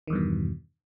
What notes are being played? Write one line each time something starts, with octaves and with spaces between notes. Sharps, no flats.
E2 G2 B2 D#3